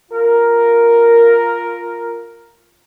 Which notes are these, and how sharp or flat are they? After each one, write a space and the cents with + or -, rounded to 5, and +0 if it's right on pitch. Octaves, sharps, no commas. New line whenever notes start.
F4 +0 A#4 +0